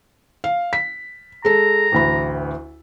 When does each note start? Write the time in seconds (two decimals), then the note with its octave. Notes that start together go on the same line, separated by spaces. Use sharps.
0.44 F5
0.73 B6
1.45 G#3 A4 A#5
1.92 A1 D2 B5